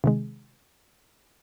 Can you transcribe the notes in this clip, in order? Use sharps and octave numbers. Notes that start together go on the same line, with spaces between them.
C3 D#3 G#3